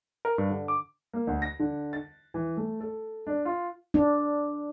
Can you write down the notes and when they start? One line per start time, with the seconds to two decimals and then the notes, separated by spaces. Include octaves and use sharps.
0.25 A#4
0.38 G2
0.50 D3
0.68 D6
1.13 A#3
1.27 D2
1.42 A#6
1.59 D3
1.93 A6
2.34 E3
2.57 A3
2.80 A4
3.27 D4
3.45 F4
3.94 D4